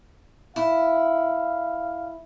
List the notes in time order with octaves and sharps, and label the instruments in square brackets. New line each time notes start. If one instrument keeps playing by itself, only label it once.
[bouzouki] E4 [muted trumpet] F5